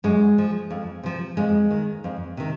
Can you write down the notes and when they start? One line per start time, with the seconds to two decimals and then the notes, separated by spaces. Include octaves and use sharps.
0.04 F#2 G#3
0.38 F3
0.70 F2
1.03 C3 F3
1.37 F2 G#3
1.71 D#3
2.04 F2
2.37 C3 D#3